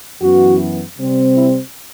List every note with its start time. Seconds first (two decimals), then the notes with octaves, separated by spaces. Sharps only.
0.21 F#2 E3 B3 F#4
0.98 C3 G3 C4
1.36 E4